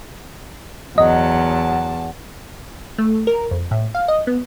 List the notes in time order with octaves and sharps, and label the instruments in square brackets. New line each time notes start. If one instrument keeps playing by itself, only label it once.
[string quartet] E2 A5 [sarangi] F#3 [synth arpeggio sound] D#5
[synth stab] A3
A#4
F2
A2
F5
D#5
B3